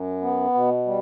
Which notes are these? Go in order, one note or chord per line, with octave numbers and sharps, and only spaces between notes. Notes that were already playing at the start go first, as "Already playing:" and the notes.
Already playing: F#2
B3
B2
G3